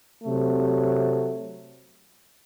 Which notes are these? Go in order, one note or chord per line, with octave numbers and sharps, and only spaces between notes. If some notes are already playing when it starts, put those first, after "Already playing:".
C3 F#3 A3